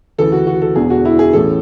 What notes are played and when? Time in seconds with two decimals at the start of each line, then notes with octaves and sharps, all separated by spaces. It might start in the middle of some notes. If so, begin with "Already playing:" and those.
0.18 D2 C#3 E3 A4
0.32 F#4
0.47 F#4
0.62 A4
0.76 E1 E2 D3 G#4
0.90 F#4
1.05 E4
1.19 G#4
1.33 A1 A2 E3 A4